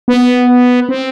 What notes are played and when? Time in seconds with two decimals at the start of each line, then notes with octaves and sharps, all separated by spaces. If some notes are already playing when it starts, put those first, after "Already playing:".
0.08 B3
0.89 C4